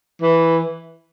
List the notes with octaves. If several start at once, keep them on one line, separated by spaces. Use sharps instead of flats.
E3